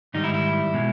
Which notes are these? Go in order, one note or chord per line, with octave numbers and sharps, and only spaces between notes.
G#2 D#3 G3 D#4
E4
E4
B2 G#3